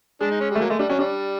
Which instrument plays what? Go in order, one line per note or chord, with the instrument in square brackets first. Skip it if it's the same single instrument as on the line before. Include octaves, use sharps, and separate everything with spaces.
[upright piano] G#3 [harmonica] D4
[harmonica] D#4
C#4
[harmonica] G3 [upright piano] A3
[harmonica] F#3 [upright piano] A#3
[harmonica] G#3 [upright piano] A3
[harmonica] G3 [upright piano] D4
[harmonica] F#3 [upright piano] C#4
[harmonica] G3 [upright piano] D4